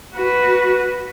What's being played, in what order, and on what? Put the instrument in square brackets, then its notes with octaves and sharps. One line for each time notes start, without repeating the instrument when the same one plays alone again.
[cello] F#4 B4